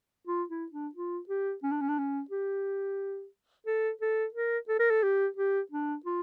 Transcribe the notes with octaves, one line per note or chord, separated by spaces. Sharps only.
F4
E4
D4
F4
G4
C#4
D4
C#4
D4
C#4
G4
A4
A4
A#4
A4
A#4
A4
G4
G4
D4
F4